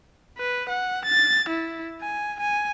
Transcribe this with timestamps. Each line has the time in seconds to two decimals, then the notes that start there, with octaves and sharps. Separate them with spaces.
0.38 B4
0.69 F#5
1.05 A6
1.49 E4
2.02 G#5
2.40 G#5